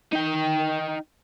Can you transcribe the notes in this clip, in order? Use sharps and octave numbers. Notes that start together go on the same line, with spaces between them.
D#4 G5